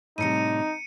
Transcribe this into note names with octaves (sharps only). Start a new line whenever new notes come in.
A2 C3 G3 D#4 A#5 C#7 D#7